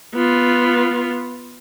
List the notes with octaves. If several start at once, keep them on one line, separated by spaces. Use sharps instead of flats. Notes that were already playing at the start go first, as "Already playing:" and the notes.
B3 F4